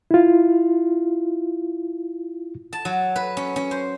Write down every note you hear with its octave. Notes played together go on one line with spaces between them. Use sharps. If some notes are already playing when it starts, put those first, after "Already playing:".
E4 F4
A5
F#3
B4
C#4
C#4
C5